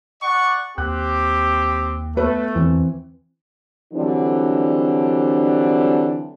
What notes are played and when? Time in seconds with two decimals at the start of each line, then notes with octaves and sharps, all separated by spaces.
0.23 D5 F#5 C#6
0.78 D#2 C4 G4 F#6
2.17 A3 B3 B4
2.55 E2 E3 C4
3.94 D3 E3 F#3 G3 C4 D4